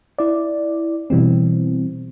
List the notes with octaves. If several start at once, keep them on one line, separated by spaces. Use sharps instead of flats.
E4 D5
B2 E3 G3 C4